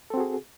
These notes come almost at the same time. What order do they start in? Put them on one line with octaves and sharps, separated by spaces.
A4 C4 F#4 G#4